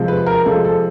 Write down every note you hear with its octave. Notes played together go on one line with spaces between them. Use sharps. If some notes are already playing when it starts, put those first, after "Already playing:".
Already playing: C3 F3 G#3
B4
A#4
C3 F3 G#3 A4
A4